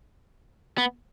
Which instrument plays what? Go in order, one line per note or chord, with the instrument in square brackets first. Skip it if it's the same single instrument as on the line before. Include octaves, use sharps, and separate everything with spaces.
[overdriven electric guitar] B3